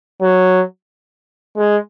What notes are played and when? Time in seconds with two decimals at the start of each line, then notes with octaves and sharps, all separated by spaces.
0.22 F#3
1.57 G#3